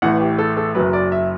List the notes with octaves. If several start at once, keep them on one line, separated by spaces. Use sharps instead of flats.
A1 A2 E3 F#5
G4
A4
A4
F#1 F#2 F#3 B4
D5
E5